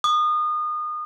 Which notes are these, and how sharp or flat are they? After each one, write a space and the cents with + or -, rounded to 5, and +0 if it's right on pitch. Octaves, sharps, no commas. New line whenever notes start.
D#6 -30